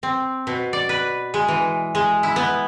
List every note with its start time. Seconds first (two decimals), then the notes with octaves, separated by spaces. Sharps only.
0.03 C4
0.47 B2
0.73 D5
0.89 B4
1.34 G#3
1.48 E3
1.95 G#3
2.23 E4
2.36 B3